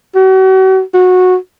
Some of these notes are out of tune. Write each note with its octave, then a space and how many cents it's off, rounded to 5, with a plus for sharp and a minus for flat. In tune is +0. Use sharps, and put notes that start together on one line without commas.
F#4 +40
F#4 -15